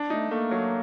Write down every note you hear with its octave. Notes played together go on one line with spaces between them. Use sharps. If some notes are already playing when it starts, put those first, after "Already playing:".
Already playing: D4
A3 D#4
A3 A#3
F#3